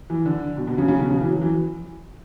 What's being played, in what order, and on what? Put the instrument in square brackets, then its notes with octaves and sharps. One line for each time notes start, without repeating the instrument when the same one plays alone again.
[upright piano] E3
D3
B2
B2
C#3
C#3
B2
C#3
E3
F#3
E3